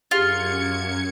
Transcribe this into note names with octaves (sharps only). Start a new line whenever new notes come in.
F#2 D4 F4 G4 G#4 G#6 C#7